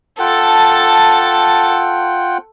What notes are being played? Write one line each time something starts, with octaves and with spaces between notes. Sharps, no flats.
F4 A4 F#5 G5 A5